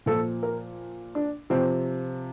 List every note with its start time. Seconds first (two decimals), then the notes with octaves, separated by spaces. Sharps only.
0.06 A#2 F3 A4
0.43 A#4
1.15 D4
1.50 C3 F3 C4